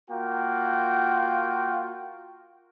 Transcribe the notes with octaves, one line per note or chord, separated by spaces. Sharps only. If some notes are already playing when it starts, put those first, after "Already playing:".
A#3 F4 F#4 G5